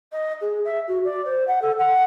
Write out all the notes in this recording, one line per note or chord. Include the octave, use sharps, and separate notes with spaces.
D#5
G#4
E5
F#4
D5
C5
F#5
A4
F#5